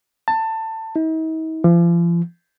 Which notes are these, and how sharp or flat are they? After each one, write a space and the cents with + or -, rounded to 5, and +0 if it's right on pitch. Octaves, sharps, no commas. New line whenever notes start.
A5 +20
D#4 +45
F3 -40